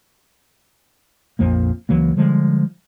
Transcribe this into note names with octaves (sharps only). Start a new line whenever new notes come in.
A#1 F2 F3 A#3
C#2 E3 F#3 A#3
D3 F3 G3 G#3